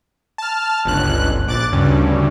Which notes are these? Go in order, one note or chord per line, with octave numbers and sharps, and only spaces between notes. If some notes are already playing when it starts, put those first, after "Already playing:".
A5 F6
G1 C#2 F#6
A#1 D6 F#6 A6
D2 G2 C#3